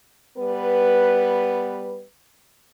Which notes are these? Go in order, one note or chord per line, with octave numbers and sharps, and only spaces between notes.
G3 B3 B4